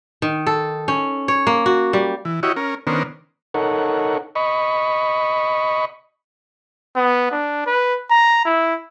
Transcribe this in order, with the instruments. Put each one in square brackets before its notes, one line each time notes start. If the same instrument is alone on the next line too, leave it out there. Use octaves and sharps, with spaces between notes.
[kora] D#3
A4
C#4
C#5
A#3
F#4
G3
[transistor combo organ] E3
E4 F#4 G4 C#5 D#5
C#4 A#4
D#3 B3 C#4 D4 A#4 C5
D#4 A4 A#4 C#5 F#5
D#5 B5 C#6
[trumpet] B3
D4
B4
A#5
E4